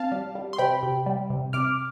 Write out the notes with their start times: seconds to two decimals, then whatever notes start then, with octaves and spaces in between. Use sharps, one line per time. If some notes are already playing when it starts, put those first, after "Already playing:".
Already playing: C4 F5 A5
0.12 G3
0.35 G3
0.53 C6
0.58 C3 G5 B5
0.83 C3
1.06 G3
1.30 C3
1.53 C3 D6 F6